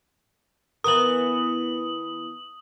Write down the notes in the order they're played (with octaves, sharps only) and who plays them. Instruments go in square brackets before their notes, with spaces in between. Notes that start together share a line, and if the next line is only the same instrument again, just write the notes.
[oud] E3 B3 A#4 [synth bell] D#6 F#7